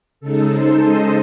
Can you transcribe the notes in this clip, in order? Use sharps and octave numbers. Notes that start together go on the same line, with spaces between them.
C#3 G#3 D#4 A4
C5
D#5